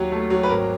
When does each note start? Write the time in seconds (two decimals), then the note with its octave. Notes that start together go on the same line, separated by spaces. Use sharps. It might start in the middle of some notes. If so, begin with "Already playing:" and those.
Already playing: D#2 F#3
0.12 A3
0.30 F#3
0.43 B4
0.49 G#1 A#4